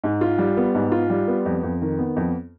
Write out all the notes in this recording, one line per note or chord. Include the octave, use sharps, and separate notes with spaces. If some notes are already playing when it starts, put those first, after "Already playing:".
G#2
F4
G3
B3
G#2
F4
G3
B3
F2
F2
D#3
B3
F2